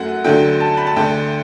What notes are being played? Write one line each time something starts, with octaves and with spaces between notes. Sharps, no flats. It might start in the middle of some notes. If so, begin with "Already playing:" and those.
Already playing: F#2 F#3 A3 F#5
D2 D3 F#3 A3 G5
A5
B5
A5
D2 D3 A3 G5